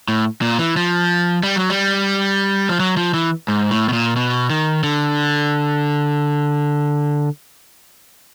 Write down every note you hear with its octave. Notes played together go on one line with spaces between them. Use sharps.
A2
A#2
E3
F3
G3
F#3
G3
F3
F#3
F3
E3
G#2
A2
B2
A#2
B2
D#3
D3